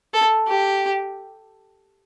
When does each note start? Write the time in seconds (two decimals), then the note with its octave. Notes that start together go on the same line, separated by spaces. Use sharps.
0.13 A4
0.47 G4